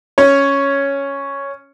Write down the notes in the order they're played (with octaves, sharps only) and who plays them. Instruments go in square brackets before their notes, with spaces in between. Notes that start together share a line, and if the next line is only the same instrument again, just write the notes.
[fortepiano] C#4 C#5